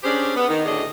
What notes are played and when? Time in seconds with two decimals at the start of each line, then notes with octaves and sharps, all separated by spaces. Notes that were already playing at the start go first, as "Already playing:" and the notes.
0.03 C#4 D4 G4 G#4 C5 D5
0.35 B3
0.48 D#3
0.66 D2 A2 C#4 D4 G#4 D#5